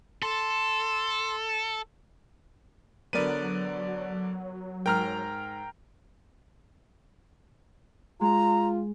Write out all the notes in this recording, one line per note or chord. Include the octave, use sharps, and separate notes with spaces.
A4 C6
D3 F#3 B3 A#4 B4 D5 D#7
G#2 A#4 G5 A#5 F6
G#3 F4 A#5